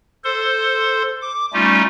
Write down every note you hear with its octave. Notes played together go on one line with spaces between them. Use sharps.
A4 C5 C6
D6
G3 A3 C#4 D#4 F4